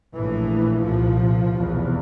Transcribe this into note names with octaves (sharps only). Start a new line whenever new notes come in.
A#1 A2 E3
C2 A#2 F3
F1 E2 B2